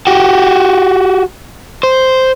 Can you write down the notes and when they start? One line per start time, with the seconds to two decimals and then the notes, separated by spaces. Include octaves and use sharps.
0.07 F#4 G4
1.83 C5